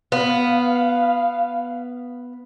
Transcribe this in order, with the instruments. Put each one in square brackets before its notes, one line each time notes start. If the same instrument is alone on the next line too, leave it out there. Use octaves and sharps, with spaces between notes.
[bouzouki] B3 [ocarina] F5